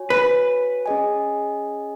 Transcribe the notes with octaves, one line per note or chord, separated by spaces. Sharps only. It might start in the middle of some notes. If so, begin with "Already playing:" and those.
Already playing: F#4 C#5 G#5
B4
C#4 G#4 D#5 G#5